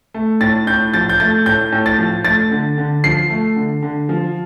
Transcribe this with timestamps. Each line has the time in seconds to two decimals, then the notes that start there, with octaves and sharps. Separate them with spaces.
0.14 A3
0.41 A2 A6
0.67 A2 G6
0.94 F3 A6
1.09 G6
1.20 A3 A6
1.46 A2 G6
1.72 A2
1.86 A6
1.98 F3
2.25 A3 A6
2.51 D3
2.78 D3
3.04 F3 C7
3.30 A3
3.56 D3
3.83 D3
4.09 F3